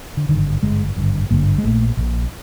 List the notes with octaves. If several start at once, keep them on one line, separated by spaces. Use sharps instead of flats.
D3
G#1 G2 D3 D#3
G#1 G2 D3 G#3
G#1 G2 D3
G#1 G2 D3 A#3
G#3
A#1 A#2 A3
A#1 A#2